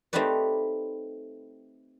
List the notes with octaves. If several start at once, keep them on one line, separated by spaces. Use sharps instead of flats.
A3 C4 D#4 G4 B4 D5